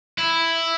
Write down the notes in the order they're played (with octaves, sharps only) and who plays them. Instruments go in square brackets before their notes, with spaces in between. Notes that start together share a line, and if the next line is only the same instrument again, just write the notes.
[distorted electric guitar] E4